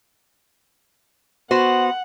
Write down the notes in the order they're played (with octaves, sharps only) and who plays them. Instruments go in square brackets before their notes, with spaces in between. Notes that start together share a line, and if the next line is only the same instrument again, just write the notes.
[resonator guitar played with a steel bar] B3 F#4 C5 [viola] F#5